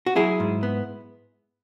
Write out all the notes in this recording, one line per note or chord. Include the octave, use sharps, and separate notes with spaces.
F#4
F#3 E4 G#4
G#2
B3